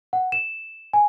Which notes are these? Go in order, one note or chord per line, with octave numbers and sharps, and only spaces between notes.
F#5
E7
G#5